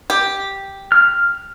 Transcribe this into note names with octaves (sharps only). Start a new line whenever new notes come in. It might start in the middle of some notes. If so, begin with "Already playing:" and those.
G4
F6